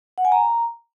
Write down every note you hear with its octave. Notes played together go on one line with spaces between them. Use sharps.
F#5
G#5
A#5